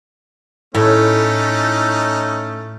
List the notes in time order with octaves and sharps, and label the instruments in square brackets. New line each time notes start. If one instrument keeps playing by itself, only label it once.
[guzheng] A2 [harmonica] A3 C#4 D#4